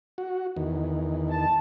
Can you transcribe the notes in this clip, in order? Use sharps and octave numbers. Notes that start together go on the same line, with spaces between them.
F#4
E2 D#3
A5